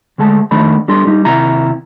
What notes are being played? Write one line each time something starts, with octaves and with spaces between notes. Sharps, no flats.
D2 G#3 A3 A5
F2 D#3 A3 D4 B5
G3 D4 A4 C6
G3 D#4 G4
D#2 C3 E4 A#5